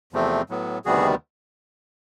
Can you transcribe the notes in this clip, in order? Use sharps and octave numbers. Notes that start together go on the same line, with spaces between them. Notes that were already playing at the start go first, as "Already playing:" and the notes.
E2 C3 F3 A3 C4
A2 F#3 B3
D2 C3 D#3 G3 B3 F#4 G#4